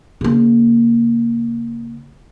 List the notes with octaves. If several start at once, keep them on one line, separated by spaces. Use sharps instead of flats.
C#3 A#3